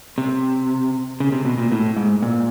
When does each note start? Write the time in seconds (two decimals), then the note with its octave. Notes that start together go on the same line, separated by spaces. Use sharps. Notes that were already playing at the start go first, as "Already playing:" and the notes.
0.18 C3
1.20 C#3
1.32 C3
1.45 B2
1.58 A#2
1.72 A2
1.96 G#2
2.22 A#2